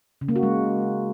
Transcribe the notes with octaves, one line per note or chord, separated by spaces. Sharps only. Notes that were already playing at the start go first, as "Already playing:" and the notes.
C#3
A#3
F#4
G#3